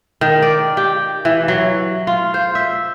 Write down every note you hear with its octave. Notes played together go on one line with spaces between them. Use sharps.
D#3
D5
G4
E3
F#3
F4
C5
E5